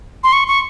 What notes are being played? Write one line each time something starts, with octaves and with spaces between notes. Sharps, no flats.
C6
C#6
C#6